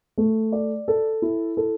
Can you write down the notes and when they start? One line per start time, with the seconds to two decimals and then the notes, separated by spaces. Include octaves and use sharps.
0.18 A3
0.52 D5
0.88 A4
1.22 E4
1.57 A4